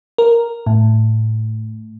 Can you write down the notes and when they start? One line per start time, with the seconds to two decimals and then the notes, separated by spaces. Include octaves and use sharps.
0.18 A#4
0.66 A2